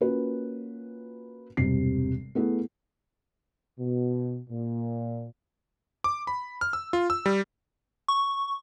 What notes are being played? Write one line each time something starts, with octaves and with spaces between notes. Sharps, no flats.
A#3 C#4 F4 F#4 B4
E1 G2 C3 C7
A3 B3 E4 G#4
B2
A#2
D6
B5
F6
E6
F4
E6
G3
C#6